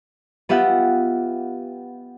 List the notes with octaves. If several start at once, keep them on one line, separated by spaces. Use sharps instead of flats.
B3 F4 G4 E5 F#5